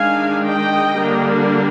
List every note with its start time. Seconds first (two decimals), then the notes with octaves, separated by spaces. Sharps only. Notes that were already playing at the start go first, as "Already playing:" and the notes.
Already playing: D#3 G#3 D4 F5 G#5
0.44 D#5 G5
0.96 D3 G3 A#3 D4